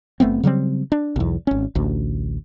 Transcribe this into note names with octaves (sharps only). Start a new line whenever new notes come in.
F#1 A3 B3 C4
C#3 F#3 G3 C4
D4
B1 E2
G#1 C#4
A1 D2